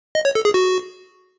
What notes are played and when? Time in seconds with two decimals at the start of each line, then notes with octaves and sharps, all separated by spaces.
0.15 D#5
0.25 C#5
0.35 A4
0.45 G#4
0.54 F#4